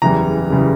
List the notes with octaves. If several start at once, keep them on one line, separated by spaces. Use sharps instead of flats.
F#1 E2 C#3 E3 G3 A#5
F#1 C#3 E3 G3